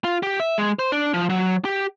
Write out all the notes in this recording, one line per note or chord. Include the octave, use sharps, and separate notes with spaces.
F4
G4
E5
G#3
C5
D4
F3
F#3
G4